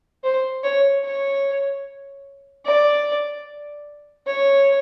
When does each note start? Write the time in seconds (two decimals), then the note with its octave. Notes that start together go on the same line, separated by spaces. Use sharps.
0.24 C5
0.64 C#5
1.04 C#5
2.66 D5
4.27 C#5